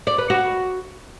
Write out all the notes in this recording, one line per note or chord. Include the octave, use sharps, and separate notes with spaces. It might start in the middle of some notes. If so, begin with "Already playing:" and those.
D5
B4
F#4